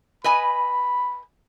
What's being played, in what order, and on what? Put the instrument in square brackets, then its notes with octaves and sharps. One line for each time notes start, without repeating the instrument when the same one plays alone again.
[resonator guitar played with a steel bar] B4 D#5 G#5 [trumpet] B5